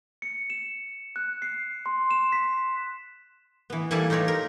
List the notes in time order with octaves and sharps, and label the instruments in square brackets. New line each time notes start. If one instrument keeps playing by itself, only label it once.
[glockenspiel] C#7
E7
F#6
C7
C6
E7
B6
[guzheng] E3 B3
E3 G3 A#3 A4 G#5 A5
D#4 F4 G4 C#5 D5
A#4